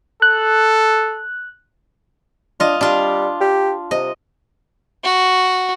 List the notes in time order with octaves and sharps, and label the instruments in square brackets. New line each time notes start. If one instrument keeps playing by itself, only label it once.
[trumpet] A4 [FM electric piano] F#6
[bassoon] D4 [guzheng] F4 D#5
[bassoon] G3 [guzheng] D4 F4
[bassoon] G4
[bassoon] C3 [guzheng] D#5
[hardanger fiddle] F#4